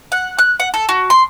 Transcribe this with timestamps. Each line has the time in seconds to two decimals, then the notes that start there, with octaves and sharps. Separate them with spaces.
0.12 F#5
0.38 F#6
0.60 F#5
0.74 A4
0.89 F#4
1.10 C6